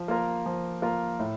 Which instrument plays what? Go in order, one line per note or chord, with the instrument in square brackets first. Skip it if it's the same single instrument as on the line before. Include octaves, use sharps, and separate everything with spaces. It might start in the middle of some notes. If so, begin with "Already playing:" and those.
Already playing: [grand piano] F3
A#3 F4 A#4
F3
A#3 F4 A#4
A2